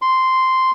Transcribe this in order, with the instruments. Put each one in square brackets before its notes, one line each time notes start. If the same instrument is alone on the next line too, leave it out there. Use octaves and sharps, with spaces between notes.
[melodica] C6